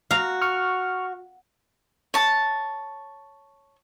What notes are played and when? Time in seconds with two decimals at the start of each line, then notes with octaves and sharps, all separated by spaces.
0.11 F#4 F5 A#5
0.42 C#6 F6
2.14 C#5 A5